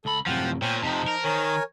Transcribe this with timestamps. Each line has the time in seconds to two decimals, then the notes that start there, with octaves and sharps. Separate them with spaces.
0.05 C#2 A4 B5
0.26 F#2 A2 C3 F3 F#5 G5 F6
0.62 A#2 C5 C#5 G5 G#5 F6
0.83 F2 C3 D#4 C5 A5
1.08 A#4
1.24 D#3 A#4 C#5 G#5